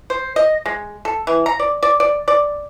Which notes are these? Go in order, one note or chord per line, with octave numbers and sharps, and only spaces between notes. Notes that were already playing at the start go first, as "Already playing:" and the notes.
C5
D#5
G#3
A4
E3
A#5
D5
D5
D5
D5